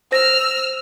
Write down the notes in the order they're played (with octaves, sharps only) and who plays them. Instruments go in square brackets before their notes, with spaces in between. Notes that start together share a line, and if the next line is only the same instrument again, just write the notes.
[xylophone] C5 A#6 [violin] E6 F6